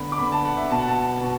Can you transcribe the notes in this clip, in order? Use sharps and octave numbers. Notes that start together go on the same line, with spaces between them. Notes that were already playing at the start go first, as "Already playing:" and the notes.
Already playing: D3 B3 B5
D6
D3 B3 B5
A5
F#5
E5
B2 B3 A5
F#5
A5
B2